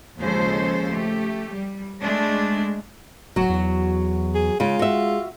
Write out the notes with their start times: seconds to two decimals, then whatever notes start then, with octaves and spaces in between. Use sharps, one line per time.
0.19 D#2 C#3 F3 G#3 A4 C5
0.91 A3 G4
1.55 G3
1.99 G#3 A3 D4
3.36 D1 F#3 F#4
3.49 E2
4.35 G#4
4.60 C#3 G#3 F4
4.79 F#4 E5